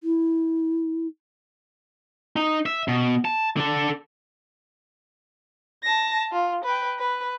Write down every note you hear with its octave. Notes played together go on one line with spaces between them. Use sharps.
E4
D#4
E5
B2
A5
D3 A4
A5 A#6
F4
B4 G5
B4